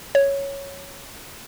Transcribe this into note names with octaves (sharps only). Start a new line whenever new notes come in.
C#5